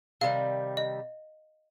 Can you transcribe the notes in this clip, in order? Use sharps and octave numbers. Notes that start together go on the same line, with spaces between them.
C3 D#3 G3 F5
D#5